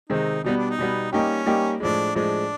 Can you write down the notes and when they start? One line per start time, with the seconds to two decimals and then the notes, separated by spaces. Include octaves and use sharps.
0.09 C3 D#3 G#3 C4 D#4
0.44 B2 G3 B3 D#4
0.57 D4
0.70 D#4
0.79 B2 G3 B3
1.12 G3 A#3 C#4 D#4 G4
1.46 G3 A#3 D#4 G4
1.80 A2 F3 G#3 D4
2.15 A2 F3 G#3 D4